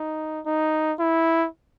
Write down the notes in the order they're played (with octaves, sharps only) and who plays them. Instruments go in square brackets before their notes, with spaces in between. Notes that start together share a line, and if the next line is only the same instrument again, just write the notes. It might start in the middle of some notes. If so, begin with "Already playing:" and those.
Already playing: [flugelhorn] D#4
D#4
E4